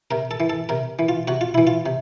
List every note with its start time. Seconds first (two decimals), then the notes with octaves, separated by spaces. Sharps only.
0.11 C3 A#4
0.31 A4
0.40 E3
0.50 A4
0.69 C3 A#4
0.99 E3
1.09 F4
1.28 C3 F#4
1.41 F4
1.54 E3 E4
1.67 F4
1.86 C3